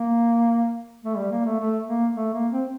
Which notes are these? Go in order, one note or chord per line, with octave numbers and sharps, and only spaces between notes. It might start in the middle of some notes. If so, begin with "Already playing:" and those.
Already playing: A#3
A3
G3
A#3
A3
A3
A#3
A3
A#3
C4